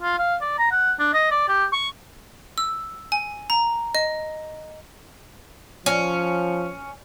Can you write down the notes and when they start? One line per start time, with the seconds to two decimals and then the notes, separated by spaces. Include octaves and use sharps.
0.02 F4
0.19 F5
0.41 D5
0.59 A#5
0.71 F#5
0.99 D4
1.14 D#5
1.31 D5
1.49 G4
1.73 C#6
2.58 E6
3.12 G#5
3.50 A#5
3.95 D#5
5.86 F3 C#4